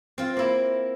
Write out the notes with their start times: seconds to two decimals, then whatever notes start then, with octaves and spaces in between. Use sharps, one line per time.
0.18 C4 F4
0.37 A#3 E4